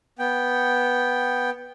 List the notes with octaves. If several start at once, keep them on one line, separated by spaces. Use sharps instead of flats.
B3 G5